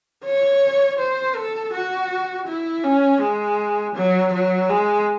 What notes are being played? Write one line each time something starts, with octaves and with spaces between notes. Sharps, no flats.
C#5
C5
A4
F#4
E4
C#4
G#3
F#3
F#3
G#3